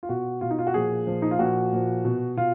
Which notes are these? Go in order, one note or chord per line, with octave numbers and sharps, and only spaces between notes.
F4
B2 F#4
B2 F4
D#4
F4
F#4
A#2 F3 G#4
A#2 F3
D#4
F4
A#2 F3 F#4
A#2 F3
B2
B2 F4